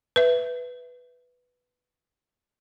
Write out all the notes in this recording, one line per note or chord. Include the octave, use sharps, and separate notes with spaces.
B4 E5